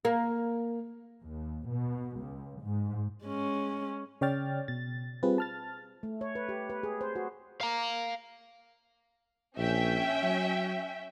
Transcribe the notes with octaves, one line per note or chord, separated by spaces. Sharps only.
A#3
D#2
B2
C#2
G#2
G#3 C#4
C#3 C#5 D5 G5 F6 A6
B2 A6
G3 C4 F4 G#4 B4
A5 F6 A6
A3
C#5
B4
G4
B4
G#4
C5
F#4
F5 A#5
A#1 C#4 E5 G5
F#3